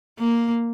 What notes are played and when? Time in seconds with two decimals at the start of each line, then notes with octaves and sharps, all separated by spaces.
0.19 A#3